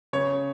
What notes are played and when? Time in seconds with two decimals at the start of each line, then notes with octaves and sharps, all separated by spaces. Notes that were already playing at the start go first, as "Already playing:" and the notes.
0.13 C#3 C#5